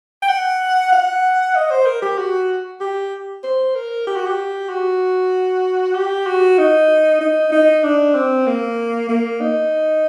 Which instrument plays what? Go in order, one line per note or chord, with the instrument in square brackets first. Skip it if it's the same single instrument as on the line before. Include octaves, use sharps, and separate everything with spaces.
[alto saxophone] G5
F#5
F#5
D#5
C5
A#4
G4
F#4
G4
C5
A#4
G4
F#4
G4
F#4
G4
F#4
D#4
D#4
D#4
D4
C4
A#3
A#3
D#4